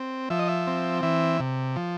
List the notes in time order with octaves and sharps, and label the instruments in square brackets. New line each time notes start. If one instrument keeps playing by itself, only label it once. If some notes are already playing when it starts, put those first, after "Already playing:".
Already playing: [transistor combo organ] C4
F3 E5
D#5
E5
C4
E3 E5
C3
F3